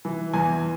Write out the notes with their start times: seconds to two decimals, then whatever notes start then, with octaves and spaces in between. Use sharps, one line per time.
0.05 E3
0.34 E2 G#5